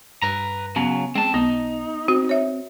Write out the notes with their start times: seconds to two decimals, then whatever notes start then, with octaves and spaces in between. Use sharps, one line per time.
0.22 G2 B4 A#5
0.76 C#3 F#3 B3
1.15 G#3 C4 A5
1.34 B1 B3 D#4
2.08 C4 F#4
2.29 C#5 E5